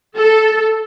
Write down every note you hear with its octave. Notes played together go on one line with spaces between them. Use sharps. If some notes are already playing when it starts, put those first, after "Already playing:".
A4